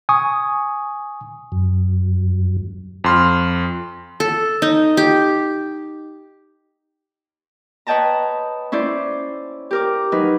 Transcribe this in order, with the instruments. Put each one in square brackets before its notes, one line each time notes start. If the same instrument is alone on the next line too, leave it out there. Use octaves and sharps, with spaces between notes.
[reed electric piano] G#5 C#6 D#6
[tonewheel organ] F#2
[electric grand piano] F2 C6 F6
[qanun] A4
D#4
G4
[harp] B4 C#5 D#5 G5 A5 A#5
C#4 E4 C5 D5
G4 A#4 D6
F#3 D#4 B4